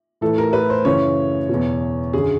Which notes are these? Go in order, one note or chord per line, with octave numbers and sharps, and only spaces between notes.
A2 E3 A4
A#4
B4
C5
F#2 C#3 E3 C#5
E2 B2
F#2 D3 G#4